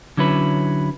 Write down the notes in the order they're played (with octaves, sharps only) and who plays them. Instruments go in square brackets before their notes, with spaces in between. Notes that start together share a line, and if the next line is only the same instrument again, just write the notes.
[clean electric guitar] D3 F#3 C#4 E4 B4